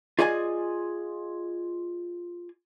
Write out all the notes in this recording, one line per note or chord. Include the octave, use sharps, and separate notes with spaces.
F4 G#4 D5 D#5 F#5 G#5